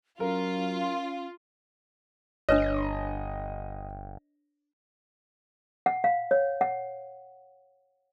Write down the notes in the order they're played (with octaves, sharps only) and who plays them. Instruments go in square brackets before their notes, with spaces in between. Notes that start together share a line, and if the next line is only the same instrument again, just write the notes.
[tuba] F#3 [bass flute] C#4 [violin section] F4 [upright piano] A#4
[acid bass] G1 [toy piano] D4 B4 C#5 [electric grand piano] D#5
[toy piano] F#5
F5
C#5
F#5